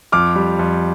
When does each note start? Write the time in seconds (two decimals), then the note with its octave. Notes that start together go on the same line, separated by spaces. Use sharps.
0.12 F2 D6 F6
0.35 G3
0.59 F2